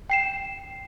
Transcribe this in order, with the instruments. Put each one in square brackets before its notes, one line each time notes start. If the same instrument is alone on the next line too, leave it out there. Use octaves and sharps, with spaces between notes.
[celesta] G5 C7 E7